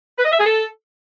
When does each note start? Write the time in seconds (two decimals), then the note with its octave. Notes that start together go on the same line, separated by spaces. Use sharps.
0.18 B4
0.25 D#5
0.32 E5
0.39 G#4
0.46 A4